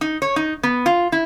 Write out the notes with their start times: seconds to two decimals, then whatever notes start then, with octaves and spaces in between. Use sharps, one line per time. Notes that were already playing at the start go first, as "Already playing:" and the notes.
0.01 D#4
0.22 C#5
0.36 D#4
0.63 B3
0.86 F4
1.12 E4